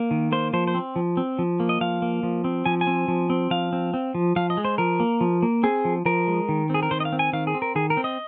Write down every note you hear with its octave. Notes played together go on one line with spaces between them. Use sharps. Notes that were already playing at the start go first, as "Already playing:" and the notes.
Already playing: A#3
D#3
A#3 C5
F3 C5
C5
C4
F3
C4
F3
A#3
D#5
F3 F5
A#3
F3
C4
F3 G#5
G#5
C4
F3
C4
F3 F5
C4
C4
F3
F3 F5
D#5
G#3
C5
F3 A#4
A#3
F3
A#3
C4 G#4
F3
F3 A#4
G#3
D#3
C4 G#4
A#4
D#3 C5
D#5
F5
C4
G#5
D#3 F5
G#4
C4
A#4
D#3 G#4
A#4
C4
D#5